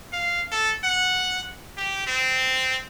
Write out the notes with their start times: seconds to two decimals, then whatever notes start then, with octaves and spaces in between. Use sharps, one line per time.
0.12 F5
0.52 A4
0.84 F#5
1.77 G4
2.07 C4